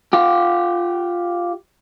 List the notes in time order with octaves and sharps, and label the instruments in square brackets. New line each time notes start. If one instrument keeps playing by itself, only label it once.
[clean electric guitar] F4 G4